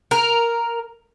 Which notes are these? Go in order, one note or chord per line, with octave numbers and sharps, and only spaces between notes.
A#4